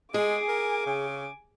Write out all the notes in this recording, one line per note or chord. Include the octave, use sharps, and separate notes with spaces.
G#3 G#4 G#5 D6
A#4
C#3